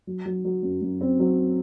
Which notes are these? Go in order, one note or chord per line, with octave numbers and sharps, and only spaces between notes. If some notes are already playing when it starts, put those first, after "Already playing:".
F#3
F#3
F#3
F#2
F#2
C4
F#3